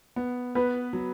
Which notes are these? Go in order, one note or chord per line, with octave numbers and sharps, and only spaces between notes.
B3
B3 B4
F#3